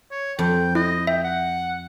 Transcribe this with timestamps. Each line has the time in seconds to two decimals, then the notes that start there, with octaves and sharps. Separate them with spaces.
0.11 C#5
0.39 F2 G5
0.75 E4 D#5
1.07 E5 G5
1.24 F#5